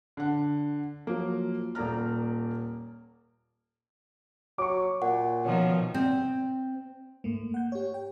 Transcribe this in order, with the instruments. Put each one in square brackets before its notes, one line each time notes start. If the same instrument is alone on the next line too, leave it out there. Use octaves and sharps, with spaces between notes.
[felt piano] D3 F#5
F3 F#3 A#3
D#1 A#3 D5 A#5 F6
[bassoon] F#3 [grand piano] C#6 D6
[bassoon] A#2 [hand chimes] F#5
[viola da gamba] B2 D#3 F3 [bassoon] C#4
[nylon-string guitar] C4
[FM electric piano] G#2 A3 A#3
F#5 G6
G4 C#5
G5